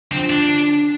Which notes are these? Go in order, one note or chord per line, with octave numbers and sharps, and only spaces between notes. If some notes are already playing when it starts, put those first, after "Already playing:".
D3 F3 C4
D4
D3